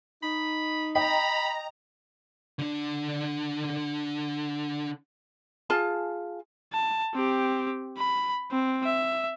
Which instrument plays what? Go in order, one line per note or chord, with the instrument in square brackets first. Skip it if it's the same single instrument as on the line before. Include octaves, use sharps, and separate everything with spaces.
[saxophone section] D#4 [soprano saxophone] B5
[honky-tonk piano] D#5 G5 [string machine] A#5 [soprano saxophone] B5
[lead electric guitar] D3 D4
[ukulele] F4 G#4 A5
[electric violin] A5
C4 G4
B5
C4
E5